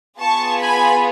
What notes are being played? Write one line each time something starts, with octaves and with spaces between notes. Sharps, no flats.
B3 F4 G#4 A5 C#6
G#5 B5